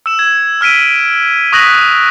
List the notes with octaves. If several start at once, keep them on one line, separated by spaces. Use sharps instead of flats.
E6 E7
G#6
E6 F6 B6 D7 D#7
C#6 D#6 F#6 A#6 B6 F#7